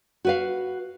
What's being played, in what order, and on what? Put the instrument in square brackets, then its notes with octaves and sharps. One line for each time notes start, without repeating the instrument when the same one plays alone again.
[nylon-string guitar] F#4 B4 F5